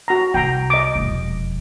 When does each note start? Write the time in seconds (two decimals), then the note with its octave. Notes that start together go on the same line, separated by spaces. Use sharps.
0.08 F#4 A#5
0.34 C2 G5 A#5
0.70 D#5 D6
0.95 E1 F2